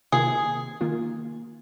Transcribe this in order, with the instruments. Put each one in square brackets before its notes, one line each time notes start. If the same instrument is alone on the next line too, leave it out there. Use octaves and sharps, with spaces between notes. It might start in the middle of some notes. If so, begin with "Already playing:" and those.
[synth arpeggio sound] C3 D#3 A#3 F4 [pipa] G#4
[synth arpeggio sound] D#3 A#3 F4